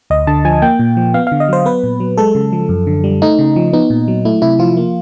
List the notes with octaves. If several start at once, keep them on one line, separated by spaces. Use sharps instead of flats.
D2 D#5
D3 A5
F3 G#5
A#3 G5
A#2
F3
B3 F5
D3 F5
D#5
F#3 C5
B3 B4
A#2
F#3
G#3 A4
C#3
F3
F#2
D3
G3
A3 D#4
C#3
F3
B3 D#4
A#2
F#3
A3 E4
C3 E4
F3 F4
A#3